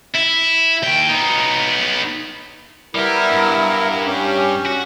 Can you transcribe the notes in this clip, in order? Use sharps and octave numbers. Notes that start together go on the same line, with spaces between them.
E4
D#2 G5
B3 D#4
G3 B3 E4 G4 A#4
G2
A#4
C#4 G4
F#4